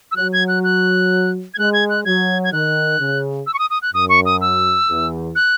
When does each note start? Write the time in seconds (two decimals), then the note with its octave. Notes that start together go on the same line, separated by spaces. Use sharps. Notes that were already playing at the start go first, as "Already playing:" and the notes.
0.11 E6
0.16 F#3 F#6
0.33 G#6
0.48 F#6
0.64 F#6
1.54 G#6
1.58 G#3 F#6
1.73 G#6
1.90 F#6
2.05 F#3 G#6
2.44 G#6
2.53 D#3 F#6
2.99 C#3
3.47 E6
3.54 C#6
3.59 D#6
3.70 D#6
3.82 F#6
3.94 F#2 D#6
4.09 C#6
4.26 D#6
4.41 E6
4.88 E2
5.35 F#6